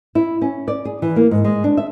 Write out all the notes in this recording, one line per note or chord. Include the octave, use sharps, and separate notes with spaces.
E4
C#4
D5
G#4
E3
A#3
G#2
G#3
D4
E5